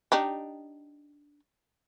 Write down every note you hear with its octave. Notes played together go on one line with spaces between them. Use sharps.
D4 D#4 G4